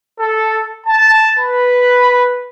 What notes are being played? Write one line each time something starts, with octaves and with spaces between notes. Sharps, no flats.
A4
A5
B4